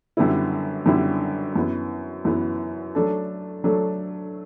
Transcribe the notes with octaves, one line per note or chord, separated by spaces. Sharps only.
F#2 D3 G3 B3 E4
F#2 D3 G3 B3 E4
F#2 E3 B3
F#2 E3 B3
F#3 A3 D4 A4
F#3 A3 D4 A4